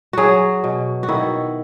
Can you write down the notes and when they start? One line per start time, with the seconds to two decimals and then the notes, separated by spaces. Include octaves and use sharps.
0.13 F#3 F#4 G#4
0.64 B2
1.03 F#4
1.09 D#3 E4